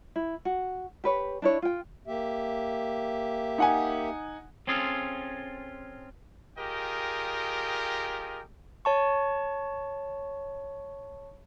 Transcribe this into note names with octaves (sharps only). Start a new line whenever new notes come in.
E4
F#4
G4 B4 C#5
D4 E4 C#5
F4 G5
A#3 G4 E5
D#4 F#5 G#5
C4 C#4 F4 G#4 A4
F4 G4 G#4 A#4 D#5 G5
C#5 A5 C#6